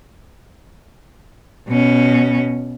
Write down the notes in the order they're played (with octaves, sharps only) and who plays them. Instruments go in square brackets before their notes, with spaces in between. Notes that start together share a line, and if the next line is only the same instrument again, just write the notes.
[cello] B2 C#4